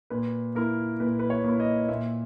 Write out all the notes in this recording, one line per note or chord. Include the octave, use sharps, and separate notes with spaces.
A#2 B4
A#3 E4 A#4
A#2 B4
B4
C#5
A#3 E4
D#5
A#2 E5